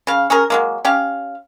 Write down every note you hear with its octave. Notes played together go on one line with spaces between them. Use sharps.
C#3 F5
C#4 G#4 A#4
F#3 G#3 A#3
C#4 G4 F5